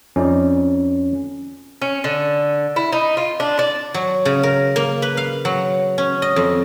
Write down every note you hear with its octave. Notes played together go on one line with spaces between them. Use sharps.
F2 C#4 D#4 D5
C#4
D3
E4
D#4
F4
D4
D5
F#3
C#3
A#4
A#3
B4
F5
F#3
C#4
D#5
F2